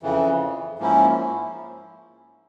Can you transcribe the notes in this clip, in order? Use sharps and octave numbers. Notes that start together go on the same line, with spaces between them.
F2 C#3 E3
G#2 F3 A#3 C#4 E4